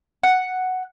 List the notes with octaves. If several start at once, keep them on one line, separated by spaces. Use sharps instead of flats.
F#5